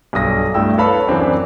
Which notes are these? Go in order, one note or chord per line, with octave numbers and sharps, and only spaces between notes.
B1 G2 D#6 A#6
G2 A3 E4 G5 E6
A4 B4 C#5 F5 A5 B5
F#2 E3 C4 D4